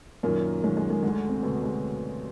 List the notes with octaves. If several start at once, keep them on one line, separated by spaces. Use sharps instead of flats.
F#2 A#2 D#3 A#3
F#2 D#3 G#3
G#3
G#3
D2 D3 G#3
C3 C4
D2 B2 D3 B3
G#3